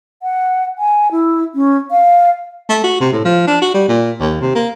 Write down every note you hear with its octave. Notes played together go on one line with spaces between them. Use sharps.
F#5
G#5
E4
C#4
F5
A3
F#4
C3
A2
F3
D4
F#4
G3
A#2
D#2
C3
A#3